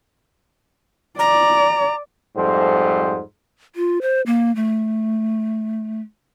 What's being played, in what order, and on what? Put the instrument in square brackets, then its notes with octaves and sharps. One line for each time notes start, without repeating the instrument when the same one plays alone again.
[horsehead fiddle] D5 [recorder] A#5
[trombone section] F2 G#2 G3 A3 C5
[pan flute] F4
C5
A#3
A3